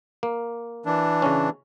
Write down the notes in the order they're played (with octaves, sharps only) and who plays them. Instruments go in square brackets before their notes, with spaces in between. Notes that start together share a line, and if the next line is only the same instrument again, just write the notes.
[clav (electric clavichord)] A#3
[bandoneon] E3 D4
[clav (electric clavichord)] C#3 C#4